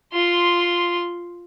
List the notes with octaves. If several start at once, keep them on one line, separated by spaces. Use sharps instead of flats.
F4 C6